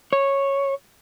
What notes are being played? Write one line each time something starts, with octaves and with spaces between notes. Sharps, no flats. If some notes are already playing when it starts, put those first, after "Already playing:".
C#5